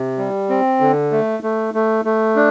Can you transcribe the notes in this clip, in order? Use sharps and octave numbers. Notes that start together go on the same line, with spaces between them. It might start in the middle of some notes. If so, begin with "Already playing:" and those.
Already playing: C3
G3
C4
D3
A3
A3
A3
A3
D4